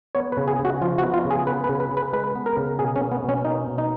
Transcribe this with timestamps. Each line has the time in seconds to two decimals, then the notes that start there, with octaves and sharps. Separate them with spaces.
0.15 B3 C#5
0.32 B4
0.37 C#3
0.48 G#4
0.59 C#3
0.65 F#4
0.82 F3 F4
0.98 F#4
1.03 B3
1.14 F4
1.25 C#3
1.31 G#4
1.47 B3 B4
1.64 B4
1.69 C#3
1.80 B4
1.92 C#3
1.97 B4
2.13 G#3 B4
2.35 B3
2.46 A#4
2.57 C#3
2.79 B2 G#4
2.96 C#4
3.01 A#3
3.12 B3
3.24 B2
3.29 C#4
3.45 A#3 D#4
3.67 B2
3.78 D#4